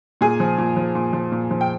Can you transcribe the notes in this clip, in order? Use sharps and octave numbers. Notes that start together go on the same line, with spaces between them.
A#2 G#4 G#5
F3
A#2
F3
A#2
F3
A#2
F3
G5